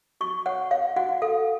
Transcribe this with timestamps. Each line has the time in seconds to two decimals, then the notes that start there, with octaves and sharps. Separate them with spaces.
0.21 F#4 C#6
0.46 C#5 F#5
0.71 C#5 F5
0.96 F#4 F#5
1.22 A4 F5